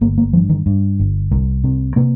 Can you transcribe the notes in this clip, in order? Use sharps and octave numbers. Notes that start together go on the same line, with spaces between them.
G1 A#3
A#3
G2 F3
D#3
G2
G1
C2
C3
C3 A#3